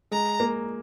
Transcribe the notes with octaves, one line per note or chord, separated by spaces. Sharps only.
G#3 A#5
A#3